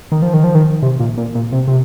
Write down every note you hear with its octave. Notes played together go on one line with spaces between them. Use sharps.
D#3
F3
D#3
F3
D#3
C3
A#2
A#2
A#2
C3
C3